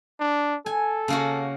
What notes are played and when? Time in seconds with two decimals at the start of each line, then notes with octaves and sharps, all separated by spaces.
0.20 D4
0.66 A4 G#5
1.08 C#3 A#3 F#4